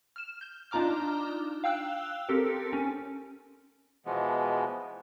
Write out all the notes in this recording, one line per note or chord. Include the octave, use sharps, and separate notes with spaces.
F6 E7
G6
D4 D#4 F4 A#5 D6 F6
F5 G5 E6 F#6
C4 G4 A4 A#4
C#4
B2 E3 F3 G#3 B3